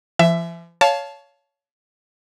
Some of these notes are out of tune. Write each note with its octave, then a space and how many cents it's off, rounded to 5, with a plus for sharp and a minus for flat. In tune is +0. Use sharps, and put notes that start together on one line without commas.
F3 -45 E5 +10
C#5 +20 F5 +0 A5 -10